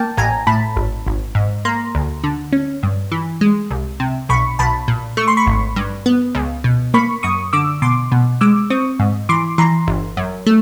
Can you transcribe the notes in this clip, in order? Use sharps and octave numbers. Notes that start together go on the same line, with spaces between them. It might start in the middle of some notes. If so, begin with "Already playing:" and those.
Already playing: A#3 G5 A5
A1 G#5 A#5
A2 A5 B5
G#1
G#1
G#2
A#3 A#5 C6
D2
D3
C#4
G2
E3
G#3
C2
C3
B1 B5 C#6
B1 A5 B5
A#2
A3 C#6
C6
B5 C#6
G#1
G2
B3
C#2
B2
A#3 B5 C#6
F#2 C#6 D#6
D3 D6 E6
B2 C6 D6
B2
G#3 D6 E6
C4 C#6 D#6
G#2
E3 C6 D6
E3 A#5 C6
G1
F#2
A3